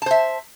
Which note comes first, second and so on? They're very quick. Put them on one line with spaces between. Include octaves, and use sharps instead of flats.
A5 C5 E5